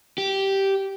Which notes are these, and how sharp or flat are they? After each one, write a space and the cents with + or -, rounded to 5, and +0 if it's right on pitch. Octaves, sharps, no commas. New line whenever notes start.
G4 -10